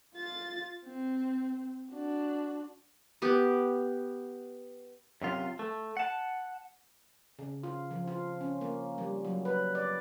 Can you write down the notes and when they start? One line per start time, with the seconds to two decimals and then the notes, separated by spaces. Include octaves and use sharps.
0.15 F4 A6
0.85 C4
1.93 D4 F#4
3.22 B3 G4
5.22 F#2 C3 F4
5.59 A3
5.97 F#5 A5
7.39 C#3
7.63 F4
7.91 F3
8.08 F4
8.41 C#4
8.61 A#3
8.98 G3
9.25 F#3
9.45 B4
9.75 D5